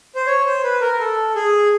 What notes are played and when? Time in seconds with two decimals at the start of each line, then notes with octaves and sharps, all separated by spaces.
0.15 C5
0.27 C#5
0.45 C5
0.63 B4
0.81 A#4
0.99 A4
1.35 G#4